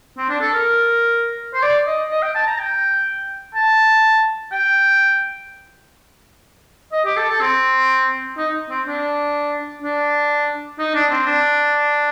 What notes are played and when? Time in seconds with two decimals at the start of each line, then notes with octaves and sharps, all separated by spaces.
0.18 C4
0.30 D4
0.41 A4
0.54 A#4
1.54 C5
1.63 D5
1.87 D#5
2.11 D#5
2.23 G5
2.35 A5
2.47 A#5
2.59 G5
3.55 A5
4.52 G5
6.93 D#5
7.05 G4
7.17 A4
7.30 A4
7.41 C4
8.38 D#4
8.70 C4
8.86 D4
9.82 D4
10.79 D#4
10.94 D4
11.11 C4
11.27 D4